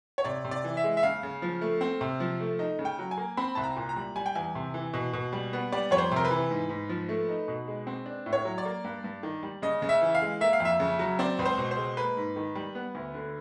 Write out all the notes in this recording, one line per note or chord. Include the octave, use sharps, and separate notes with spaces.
C#5
C3 D5
C3
D5
E3
E5
G#3
E5
C#3 F5
C#3
F3
A3
C4
C3
F3
A3
D#4
C#3
G5
F#3
G#5
A#3
C4 B5
C2 A5
A#5
A#2
A#5
G3
G3 G#5
G5
E2 G#5
C3
E3
B2
B2
G3
B3
G3 D5
F2 C#5
C5
C3 A#4
B4
E3
G#2
G#2
F3
A3
D#4
B2
G#3
C4
D4
A2
C#5
F#3
D5
A#3
G2
G2
D#3
G3
C#3 D#5
C#3
E5
E3
F5
G#3
A#3 E5
F5
F2 E5
C#3
F#3
C4 D5
C#2 B4
C5
B2
C5
G#3
A#3 B4
G#2
D#3
G3
B3
D2
D3